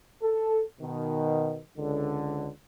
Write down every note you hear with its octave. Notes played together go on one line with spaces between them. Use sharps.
A4
B2 D#3
C#2 D3